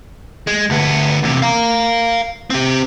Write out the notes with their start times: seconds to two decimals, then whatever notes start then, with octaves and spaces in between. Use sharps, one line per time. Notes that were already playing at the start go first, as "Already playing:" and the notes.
0.47 G#3
0.70 D2 B3
1.23 E2 C3
1.42 F5 A#5
2.50 C4 G4